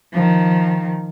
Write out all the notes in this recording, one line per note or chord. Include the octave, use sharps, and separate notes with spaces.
D#3 F3